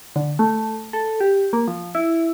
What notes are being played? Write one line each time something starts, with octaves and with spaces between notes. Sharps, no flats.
D3
A3
A4
G4
A#3
F3
E4